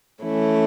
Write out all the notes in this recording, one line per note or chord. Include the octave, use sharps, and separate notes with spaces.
E3 A3 C#4 E4